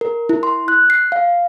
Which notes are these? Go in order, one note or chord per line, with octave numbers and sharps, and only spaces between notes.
A#4
E4
C6
F#6
C7
F5